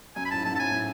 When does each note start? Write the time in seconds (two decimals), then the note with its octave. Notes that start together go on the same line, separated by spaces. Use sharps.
0.16 F#2 G#5
0.25 B5
0.31 A2 A5
0.37 G#2
0.45 F#2 A5
0.53 G#2
0.55 A5
0.60 A2 G#5
0.71 A2